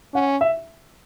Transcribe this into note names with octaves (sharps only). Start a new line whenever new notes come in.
C#4 F#5
E5